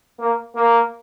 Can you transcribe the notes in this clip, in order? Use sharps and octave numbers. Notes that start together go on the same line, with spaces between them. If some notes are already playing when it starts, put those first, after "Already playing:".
A#3
A#3